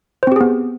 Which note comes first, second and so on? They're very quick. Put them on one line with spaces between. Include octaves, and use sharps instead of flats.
C5 C4 G4 G#4 B3